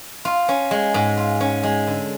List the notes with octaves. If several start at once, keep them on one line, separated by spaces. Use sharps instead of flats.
F4
C#4
G#3
G#2
F4
C#4
G#3
D3